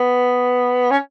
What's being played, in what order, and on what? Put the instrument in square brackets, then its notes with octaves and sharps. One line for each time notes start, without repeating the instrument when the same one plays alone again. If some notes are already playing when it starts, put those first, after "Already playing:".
Already playing: [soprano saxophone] B3
C#4